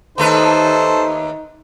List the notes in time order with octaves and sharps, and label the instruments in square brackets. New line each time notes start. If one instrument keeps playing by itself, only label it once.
[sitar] D#2 A3 B4 [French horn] D#4 [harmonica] A4 C5